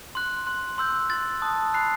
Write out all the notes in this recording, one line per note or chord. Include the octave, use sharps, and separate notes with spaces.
C6 F#6
C6 F#6
C6 E6 G6
C6 F#6 A6
A5 D#6 F#6
B5 F#6 C7